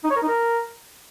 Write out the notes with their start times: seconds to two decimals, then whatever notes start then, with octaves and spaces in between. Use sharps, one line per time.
0.04 D#4
0.10 C#5
0.16 A#4
0.22 D#4
0.29 A#4